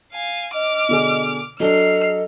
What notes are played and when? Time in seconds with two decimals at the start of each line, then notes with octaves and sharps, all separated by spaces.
0.13 F5 G#5
0.54 D#5 D6 F6
0.89 B2 D3 G#4
1.60 F#3 D4 A4 D#5 F6 C7